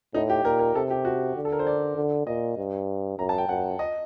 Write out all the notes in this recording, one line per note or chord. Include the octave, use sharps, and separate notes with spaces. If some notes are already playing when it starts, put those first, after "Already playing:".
A2 D#4
G4
A#2 A#4
A#4
C3 A4
G4
F#4
D3
A4
A#4
C5
D5
D3
A#2 D#5
G2
F#2 A#5
A5
G5
F#2 F#5
D#5